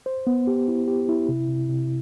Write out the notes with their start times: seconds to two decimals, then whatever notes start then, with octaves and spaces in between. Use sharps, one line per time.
0.06 C5
0.27 B3
0.47 G4
0.68 E4
0.88 G4
1.09 E4
1.29 C3
1.49 C3
1.69 C3